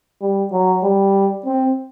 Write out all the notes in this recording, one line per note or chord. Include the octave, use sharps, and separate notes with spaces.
G3
F#3
G3
C4